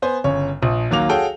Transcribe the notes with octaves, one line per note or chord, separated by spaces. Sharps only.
B3 C5 G#5
G1 C#3 C#5
A#1 F3 D#6
D#2 F#3 A#3 D6 F7
F#4 G#4 A4 C#5 F5 G5